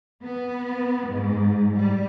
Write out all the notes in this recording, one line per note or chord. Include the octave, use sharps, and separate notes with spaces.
B3
G#2
G3